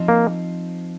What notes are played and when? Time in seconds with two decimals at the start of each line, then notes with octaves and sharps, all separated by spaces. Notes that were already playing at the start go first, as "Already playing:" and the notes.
Already playing: F3 C4 D#4
0.08 A#3